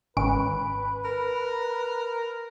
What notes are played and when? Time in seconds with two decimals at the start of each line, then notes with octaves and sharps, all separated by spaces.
0.17 G#1 C#4 B4 D7
1.05 A#4